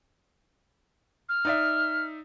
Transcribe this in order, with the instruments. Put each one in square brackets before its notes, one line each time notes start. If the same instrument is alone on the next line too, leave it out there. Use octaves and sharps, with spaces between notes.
[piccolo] F6
[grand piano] D#4 D5 E5